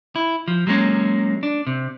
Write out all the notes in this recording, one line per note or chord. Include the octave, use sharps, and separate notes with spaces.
E4
F3
F#3 G#3 A#3 C#4
D4
C3